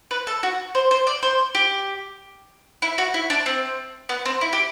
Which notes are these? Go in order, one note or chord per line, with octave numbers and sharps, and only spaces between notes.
B4
A4
F#4
C5
C5
D5
C5
G4
E4
F#4
E4
D4
C4
B3
C4
E4
G4